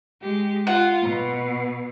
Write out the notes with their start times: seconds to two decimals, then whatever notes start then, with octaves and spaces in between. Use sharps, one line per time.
0.20 G#3 G4
0.67 F4 F#5
1.00 B2